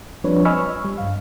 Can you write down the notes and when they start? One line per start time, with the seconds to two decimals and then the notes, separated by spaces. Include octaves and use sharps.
0.24 F3 G3 C4 D4 B4 C#5
0.45 D#5 G#5 B5 C#6 E6 F6
0.85 G3
0.98 G2 F5